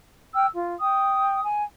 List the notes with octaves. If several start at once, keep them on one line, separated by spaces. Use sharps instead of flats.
G5 E6 F6
F4
G5 D#6
G#5